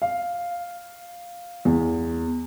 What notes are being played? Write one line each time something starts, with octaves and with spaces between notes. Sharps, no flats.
F5
E2